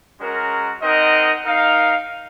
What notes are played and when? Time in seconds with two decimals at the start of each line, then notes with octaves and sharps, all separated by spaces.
0.20 G#3 C#4 F#4 A#4
0.82 C4 D#4 A#4 D#5 F#5
1.45 D#4 A#4 F5